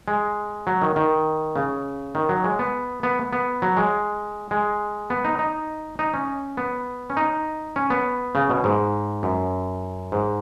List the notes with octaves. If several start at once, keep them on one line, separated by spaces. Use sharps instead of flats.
G#3
F#3
D#3
D#3
C#3
D#3
F#3
G#3
B3
B3
B3
F#3
G#3
G#3
B3
D#4
D#4
D#4
C#4
B3
C#4
D#4
C#4
B3
C#3
B2
G#2
F#2
G#2